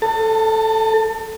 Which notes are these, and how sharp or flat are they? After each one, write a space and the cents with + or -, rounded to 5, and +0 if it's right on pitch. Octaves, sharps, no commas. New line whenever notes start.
A4 +0 A5 +35